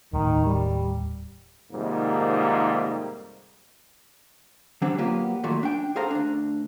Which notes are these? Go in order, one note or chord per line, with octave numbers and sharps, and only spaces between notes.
D#1 D#2 A2 D#3
G3
F2 G#2 C3 D#3 G3 A#3
D3 F#3 G3 C4 D4 G4
F#3 A#3 B3 F4 G4
D#2 A#2 F#3 A3
D4 G5
G#4 A4 C5 F5 A#5
D2 D4